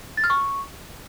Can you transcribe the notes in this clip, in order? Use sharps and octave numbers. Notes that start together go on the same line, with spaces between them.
A6
F6
C#6